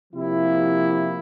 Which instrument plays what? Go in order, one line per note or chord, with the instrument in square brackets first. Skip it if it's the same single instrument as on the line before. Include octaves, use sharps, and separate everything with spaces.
[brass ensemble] C3 F3 A#3 E4 G4